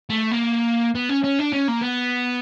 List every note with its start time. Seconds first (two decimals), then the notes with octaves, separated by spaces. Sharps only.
0.10 A3
0.31 A#3
0.95 B3
1.09 C#4
1.24 C#4
1.39 D4
1.52 C#4
1.68 A#3
1.81 B3